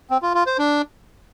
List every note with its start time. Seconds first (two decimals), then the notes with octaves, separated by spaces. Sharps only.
0.10 C4
0.22 F4
0.34 F4
0.46 C5
0.58 D4